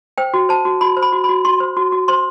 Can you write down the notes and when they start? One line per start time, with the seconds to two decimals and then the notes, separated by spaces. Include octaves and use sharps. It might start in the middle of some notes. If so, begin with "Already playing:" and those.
0.18 C5 G5
0.34 F#4
0.49 C5 A5
0.65 F#4
0.81 F#4 B5
0.97 C5
1.02 B5
1.12 F#4
1.24 B5
1.29 F#4
1.45 F#4 C6
1.60 C5
1.77 F#4
1.92 F#4
2.08 C5 C6